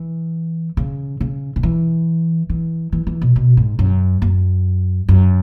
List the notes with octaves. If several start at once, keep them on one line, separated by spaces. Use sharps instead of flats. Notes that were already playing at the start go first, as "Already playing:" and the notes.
Already playing: E3
C#3
C#3
C#3
E3
E3
E3
E3
B2
B2
G#2
F#2
F#2
F#2